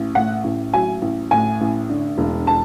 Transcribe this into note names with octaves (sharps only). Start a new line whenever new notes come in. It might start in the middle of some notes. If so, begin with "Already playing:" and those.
Already playing: A1
A2 F#5
A1
F#3 G#5
A1
A2 G#5
A1
D3
E1
A5